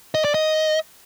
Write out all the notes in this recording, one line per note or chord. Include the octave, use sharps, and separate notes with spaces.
D#5
D5
D#5